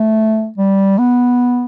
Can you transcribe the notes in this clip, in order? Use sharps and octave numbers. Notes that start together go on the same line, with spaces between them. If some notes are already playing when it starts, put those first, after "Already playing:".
Already playing: A3
G3
B3